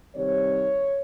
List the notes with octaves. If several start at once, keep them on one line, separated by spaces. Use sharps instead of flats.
C3 D#3 G3 C4 C#5